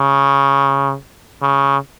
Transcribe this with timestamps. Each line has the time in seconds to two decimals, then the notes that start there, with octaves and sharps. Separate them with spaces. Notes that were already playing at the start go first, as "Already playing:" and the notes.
Already playing: C#3
1.42 C#3